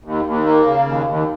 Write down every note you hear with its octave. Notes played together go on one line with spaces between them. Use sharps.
D#2
D#2
A#3
C#3
D#2
D#2